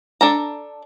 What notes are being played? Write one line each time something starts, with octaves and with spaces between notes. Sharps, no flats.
D4 A4 A#5